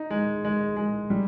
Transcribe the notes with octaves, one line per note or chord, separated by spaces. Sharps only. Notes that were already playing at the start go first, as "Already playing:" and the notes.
Already playing: D#4
G#3
G#3
G#3
G3